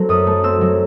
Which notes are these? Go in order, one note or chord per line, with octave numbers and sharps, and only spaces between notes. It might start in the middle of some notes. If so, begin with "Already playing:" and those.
Already playing: F#3 A3 C4
F#2 D#6
A3
C4 E6
F#3